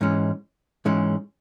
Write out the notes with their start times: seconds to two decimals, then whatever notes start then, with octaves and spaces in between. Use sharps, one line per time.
0.01 G#2 E3 G#3 C#4
0.85 G#2 E3 G#3 C#4